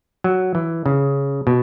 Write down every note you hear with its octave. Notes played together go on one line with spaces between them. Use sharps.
F#3
E3
C#3
B2